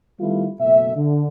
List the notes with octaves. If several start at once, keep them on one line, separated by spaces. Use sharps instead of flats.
D#3 G3 A3 B3 E4 F4
F#1 B2 A3 E5
D3